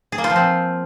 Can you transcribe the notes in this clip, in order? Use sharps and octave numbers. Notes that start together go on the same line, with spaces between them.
G#4
A#3
F4
F3
C4